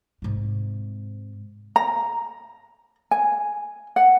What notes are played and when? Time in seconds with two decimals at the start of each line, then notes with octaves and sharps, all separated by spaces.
0.22 G#2 C3
1.76 A#5
3.11 G#5
3.96 F#5